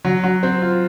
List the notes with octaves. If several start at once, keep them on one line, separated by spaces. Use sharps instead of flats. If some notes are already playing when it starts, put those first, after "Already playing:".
F#3
F#3
C4
F4